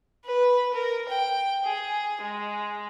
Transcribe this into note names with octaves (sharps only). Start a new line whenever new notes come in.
B4
A#4
G5
G#4
G#3